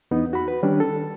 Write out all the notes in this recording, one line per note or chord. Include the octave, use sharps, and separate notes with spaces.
E2 B3 D#4
F#4 B5
B4
D#3 G3 C#4 D4
A4